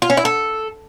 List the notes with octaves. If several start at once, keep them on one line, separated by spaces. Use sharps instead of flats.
F4
C#4
E4
A4